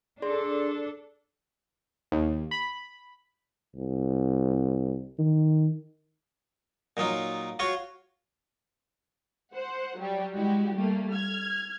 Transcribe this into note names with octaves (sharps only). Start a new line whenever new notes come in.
D4 G#4 A4 D5 C6
D#2
B5
C2
D#3
A#2 F#3 D#4 F4
F4 F#4 C#5 C6
C5 F#5
F#3 G3 G4
G#3 E4 F#4 G4
G3 A3 A#3
F6 G#6